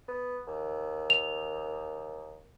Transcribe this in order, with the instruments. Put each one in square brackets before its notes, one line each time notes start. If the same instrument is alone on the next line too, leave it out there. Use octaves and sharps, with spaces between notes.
[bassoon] B3
D#2
[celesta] F7